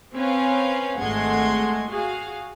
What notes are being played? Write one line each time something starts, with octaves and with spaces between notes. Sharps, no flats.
C4 C#4 B4 F5
G#1 G#3 A3 F#5 C6 G#6
F#4 G#4 F5